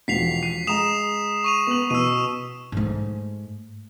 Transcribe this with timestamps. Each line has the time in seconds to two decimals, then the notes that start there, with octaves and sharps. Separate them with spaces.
0.08 E1 F3 B6 C7 F7
0.43 C7 D#7
0.67 G#3 A#5 D#6 E7 F7
1.44 C#6 D#7 F7
1.67 B3 F#7
1.90 B2 E6 D#7
2.72 G#2 A3